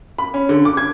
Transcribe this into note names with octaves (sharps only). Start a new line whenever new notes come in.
B5
C#4
D3
D6
G#6